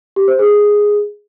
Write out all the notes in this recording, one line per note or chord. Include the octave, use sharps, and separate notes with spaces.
G4
C5
G#4